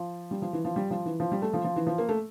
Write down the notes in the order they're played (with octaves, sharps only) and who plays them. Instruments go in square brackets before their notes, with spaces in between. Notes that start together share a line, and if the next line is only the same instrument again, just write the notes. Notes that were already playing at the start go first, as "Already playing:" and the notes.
Already playing: [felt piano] F3
G3
F3
E3
F3
G3
F3
E3
F3
G3
A3
F3
F3
E3
F3
A#3
A3